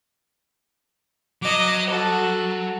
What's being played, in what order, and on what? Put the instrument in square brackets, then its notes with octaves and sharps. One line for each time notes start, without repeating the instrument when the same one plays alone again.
[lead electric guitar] F#3 [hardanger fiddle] D#5 D6
[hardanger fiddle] F#4 A4